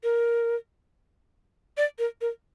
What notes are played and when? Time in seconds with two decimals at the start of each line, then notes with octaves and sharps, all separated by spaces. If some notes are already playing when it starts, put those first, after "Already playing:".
0.04 A#4
1.77 D5
1.99 A#4
2.21 A#4